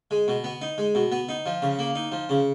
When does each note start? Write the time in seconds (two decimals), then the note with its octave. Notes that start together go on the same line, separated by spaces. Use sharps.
0.11 G#3
0.28 B2
0.44 B3
0.61 D#4
0.78 G#3
0.95 B2
1.12 B3
1.29 D#4
1.46 F3
1.62 C#3
1.79 A#3
1.95 D#4
2.12 F3
2.29 C#3